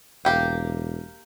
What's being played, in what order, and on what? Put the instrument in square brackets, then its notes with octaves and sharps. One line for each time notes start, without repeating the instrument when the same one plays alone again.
[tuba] E1 [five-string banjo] A#3 G4 G5